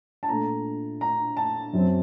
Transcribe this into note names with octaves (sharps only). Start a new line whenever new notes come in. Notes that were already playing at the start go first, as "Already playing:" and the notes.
A5
A#2 A3 D4 A#5
A#5
A5
F#2 F#3 C4